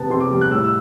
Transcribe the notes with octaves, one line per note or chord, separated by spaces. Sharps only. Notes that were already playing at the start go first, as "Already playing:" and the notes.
Already playing: C3 B3 A5
C3 C6
D6
G3
F#6
A2 E6
E6